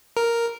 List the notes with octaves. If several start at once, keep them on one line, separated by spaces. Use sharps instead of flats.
A#4